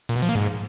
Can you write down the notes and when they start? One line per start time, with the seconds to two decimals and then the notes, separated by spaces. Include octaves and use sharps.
0.09 A#2
0.16 B2
0.22 F3
0.29 A#3
0.35 G#2